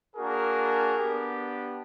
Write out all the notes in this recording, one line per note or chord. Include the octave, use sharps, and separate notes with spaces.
A#3 D4 F#4 G#4 A#4
B3 D4 G4